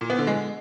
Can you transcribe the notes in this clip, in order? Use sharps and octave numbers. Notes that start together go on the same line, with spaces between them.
A#2
B3
D3
G#3